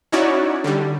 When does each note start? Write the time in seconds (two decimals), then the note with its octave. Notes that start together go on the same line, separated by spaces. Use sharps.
0.12 C#4 D#4 E4 F#4 C#5 D5
0.64 D3 G3